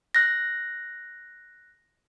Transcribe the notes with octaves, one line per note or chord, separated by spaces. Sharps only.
F#6 A#6